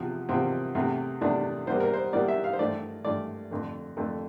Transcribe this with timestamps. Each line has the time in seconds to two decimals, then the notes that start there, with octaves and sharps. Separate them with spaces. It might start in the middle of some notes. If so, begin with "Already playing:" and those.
Already playing: E2 C3 F3
0.29 E2 C3 F3 C4
0.75 E2 C3 E3 A3
1.21 E2 C3 E3 A3 D4
1.67 E2 E3 G3 A#3 C5
1.80 A#4
1.94 C5
2.13 E2 E3 G3 A#3 D5
2.28 E5
2.44 F5
2.53 C5
2.59 G2 E3 A3 D5
3.05 G2 E3 A3 D5
3.51 F2 D3 A3
3.97 F2 D3 A3